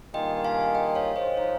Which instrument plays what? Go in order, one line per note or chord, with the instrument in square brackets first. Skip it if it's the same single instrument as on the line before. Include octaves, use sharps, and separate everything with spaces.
[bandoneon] G2 D#3 A#3 F4 G#4 [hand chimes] D#5 G5
[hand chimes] F5 G#5
D#5 G5
C#5 F5
C5 D#5
[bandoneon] F3 G#3 D#4 [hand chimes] C#5 F5